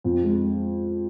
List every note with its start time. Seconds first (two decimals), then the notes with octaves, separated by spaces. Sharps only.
0.04 F2
0.23 G#3